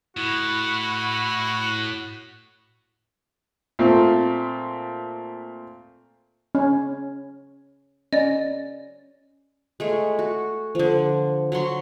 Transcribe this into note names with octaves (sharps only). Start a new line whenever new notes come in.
A2 E4 F#4
A#2 A3 C4
C#4
C#4 D5 D#5
G#3 A3 C#5
F#4
D3 F3
F#3 F#5 C6 C#6